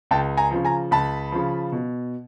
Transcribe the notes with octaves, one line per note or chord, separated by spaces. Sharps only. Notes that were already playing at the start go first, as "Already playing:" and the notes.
C#2 G5 A5
G#5 A#5
C#3 F3
G#5 A#5
C#2 A5 B5
C#3 F3
B2